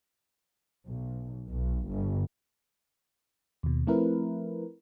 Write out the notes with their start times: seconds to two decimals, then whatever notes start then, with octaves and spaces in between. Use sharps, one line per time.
0.87 B1
1.49 B1
1.89 G1
3.63 D#2 B2
3.87 F3 A3 C4 E4 A#4 B4